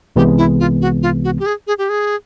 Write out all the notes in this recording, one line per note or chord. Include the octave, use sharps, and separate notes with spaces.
C2 C3 E3 G#3 B3 G4
E4
F4
F#4
F4
F#4
G4
G#4
G#4
G4
G#4